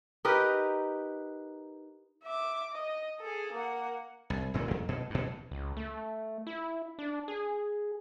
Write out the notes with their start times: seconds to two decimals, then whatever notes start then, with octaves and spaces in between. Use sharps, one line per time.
0.25 D#4 G4 A#4 B4
2.23 E5 D6
2.72 D#5
3.20 G#4 A4
3.53 A#3 F#5
4.30 C2
4.54 G1 A#2 G#3
4.68 F2 A#3
4.89 B2
5.10 G2 B2
5.51 C#2
5.77 A3
6.47 E4
6.99 D4
7.28 G#4